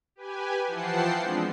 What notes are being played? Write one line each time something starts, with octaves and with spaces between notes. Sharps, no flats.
G4 B4 G#5
E3 F3 F#5 G5 A5 C7
F3 G#3 B3 C4 D4